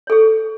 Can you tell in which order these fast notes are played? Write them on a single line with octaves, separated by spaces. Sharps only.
C#5 A4 G#4